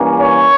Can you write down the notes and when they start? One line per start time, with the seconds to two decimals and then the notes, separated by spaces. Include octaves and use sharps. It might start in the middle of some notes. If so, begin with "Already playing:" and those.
Already playing: G2 E3 A#3 C#4
0.18 C#5